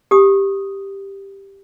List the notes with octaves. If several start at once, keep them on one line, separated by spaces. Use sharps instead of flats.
G4 D#6